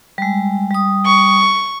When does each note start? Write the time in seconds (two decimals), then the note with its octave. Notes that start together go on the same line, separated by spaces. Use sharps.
0.18 G3 G#3
0.71 G3 D#6
1.06 C#6